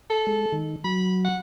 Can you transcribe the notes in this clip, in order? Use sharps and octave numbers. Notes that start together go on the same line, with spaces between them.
A4
G#3
D#3
F#3 B5
F#5